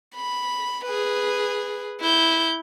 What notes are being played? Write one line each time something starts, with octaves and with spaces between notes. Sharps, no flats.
B5
G#4 B4
E4 G6